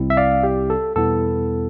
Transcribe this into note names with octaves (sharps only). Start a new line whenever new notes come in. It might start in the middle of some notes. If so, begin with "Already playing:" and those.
Already playing: C2 C3 G3 C4 E4
E5
D5 F5
G4
A4
E2 B2 G3 B3 E4 A4